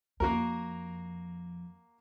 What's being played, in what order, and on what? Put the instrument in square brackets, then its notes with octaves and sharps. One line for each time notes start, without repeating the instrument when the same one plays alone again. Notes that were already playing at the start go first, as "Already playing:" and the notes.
[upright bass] F2 [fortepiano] A#3 F#4 A#4